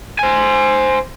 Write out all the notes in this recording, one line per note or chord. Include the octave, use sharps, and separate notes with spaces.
C5 G#5